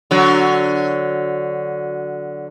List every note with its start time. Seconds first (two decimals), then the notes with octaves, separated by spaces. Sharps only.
0.11 D3 F#3